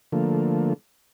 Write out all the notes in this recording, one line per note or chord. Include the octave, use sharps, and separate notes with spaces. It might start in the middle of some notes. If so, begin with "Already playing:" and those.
D3 F3 A3 A#3